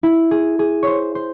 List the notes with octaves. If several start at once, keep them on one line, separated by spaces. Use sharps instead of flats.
E4
G#4
G#4
C5 C#5
C5